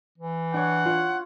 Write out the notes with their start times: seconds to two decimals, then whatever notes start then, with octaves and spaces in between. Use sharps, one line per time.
0.18 E3
0.54 D4 C#5 F#5
0.85 F4 C#5